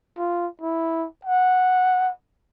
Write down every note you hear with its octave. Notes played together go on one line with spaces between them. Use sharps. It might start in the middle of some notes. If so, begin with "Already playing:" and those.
F4
E4
F#5